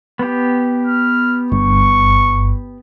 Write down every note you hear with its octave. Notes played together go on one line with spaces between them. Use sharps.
B3 G4
F6
G1 G2 C#6